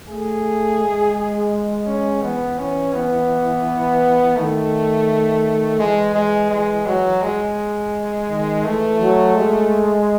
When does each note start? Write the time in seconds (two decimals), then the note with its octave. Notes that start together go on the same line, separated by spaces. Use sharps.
0.08 A3 G#4
0.80 G#3
1.86 C#4
2.22 E3 B3
2.58 C#4
2.93 B3
4.37 D#3 A3
5.79 E3 G#3
6.14 G#3
6.50 G#3
6.86 F#3
7.22 G#3
8.29 D#3
8.64 E3 A3
9.00 F#3
9.35 G#3